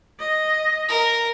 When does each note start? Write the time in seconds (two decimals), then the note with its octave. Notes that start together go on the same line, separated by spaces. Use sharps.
0.20 D#5
0.89 A#4